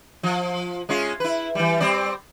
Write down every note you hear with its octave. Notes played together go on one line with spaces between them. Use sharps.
F3
G#3 C#4 F4
E4 B4
E3 G3
G3 C4 D5